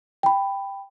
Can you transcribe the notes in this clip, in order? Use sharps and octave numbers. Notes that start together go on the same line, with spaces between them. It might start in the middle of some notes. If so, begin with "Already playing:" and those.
G5 B5